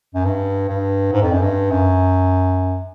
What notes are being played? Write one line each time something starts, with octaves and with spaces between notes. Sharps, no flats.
F#2
G2
G2
G#2
F2
F#2
G2
F#2